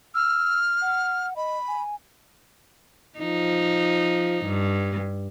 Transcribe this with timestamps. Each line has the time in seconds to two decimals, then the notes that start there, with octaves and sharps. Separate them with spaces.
0.15 E6 F6
0.82 F#5
1.36 D#5 B5
1.68 G#5
3.19 F3 D#4
4.45 G2